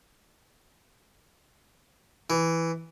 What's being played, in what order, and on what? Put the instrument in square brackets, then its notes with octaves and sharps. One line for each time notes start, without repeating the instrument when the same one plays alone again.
[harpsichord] E3